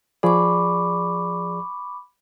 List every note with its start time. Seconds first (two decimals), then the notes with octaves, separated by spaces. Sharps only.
0.23 F3 G#4 D5 B5 C#6 D6